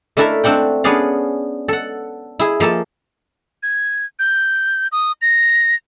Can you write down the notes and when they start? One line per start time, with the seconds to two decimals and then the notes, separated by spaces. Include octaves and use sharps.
0.17 A3 D4 E4 A4 A#4 E5
0.44 A3 C4 D4 F#5 G5
0.84 B3 C#4 D4 G#4 D5 F5
1.68 A4 F#5
2.39 E4 G#4
2.60 F3 A#3 A4 A5
3.63 G#6
4.19 G6
4.92 D#6
5.22 A#6